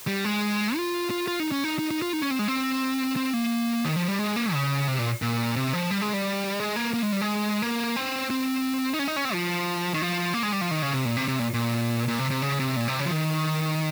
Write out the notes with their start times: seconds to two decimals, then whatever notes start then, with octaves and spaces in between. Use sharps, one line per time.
0.07 G3
0.24 G#3
0.76 F4
1.10 F4
1.28 F4
1.40 D#4
1.52 C#4
1.64 D#4
1.79 D#4
1.91 D#4
2.02 F4
2.13 D#4
2.21 C#4
2.31 C4
2.39 G#3
2.48 C4
3.16 C4
3.33 A#3
3.85 D#3
3.96 F3
4.08 G3
4.19 G#3
4.36 A#3
4.53 C#3
4.88 C3
4.99 A#2
5.22 A#2
5.56 C3
5.73 F3
5.91 G3
6.02 G#3
6.13 G3
6.60 G#3
6.76 A#3
6.94 A#3
7.03 G#3
7.12 G3
7.21 G#3
7.62 A#3
7.96 C4
8.30 C4
8.93 D#4
8.99 C#4
9.08 D#4
9.16 C#4
9.25 C4
9.33 F3
9.94 D#3
10.02 F3
10.34 A#3
10.43 G#3
10.52 G3
10.61 F3
10.71 D#3
10.82 C#3
10.93 C3
11.05 A#2
11.17 C3
11.28 C3
11.39 A#2
11.54 A#2
12.08 A#2
12.19 C3
12.30 C3
12.42 C#3
12.60 C3
12.76 A#2
12.88 C3
13.00 C#3
13.06 F3
13.10 D#3